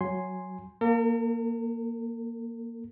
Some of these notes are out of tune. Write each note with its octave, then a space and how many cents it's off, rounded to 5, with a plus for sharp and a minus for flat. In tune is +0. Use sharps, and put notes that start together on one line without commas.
F#3 +0 G#5 +0 C6 +0
A#3 +0 A#4 -45